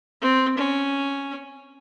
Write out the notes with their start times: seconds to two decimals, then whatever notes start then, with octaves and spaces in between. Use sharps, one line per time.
0.22 C4
0.58 C#4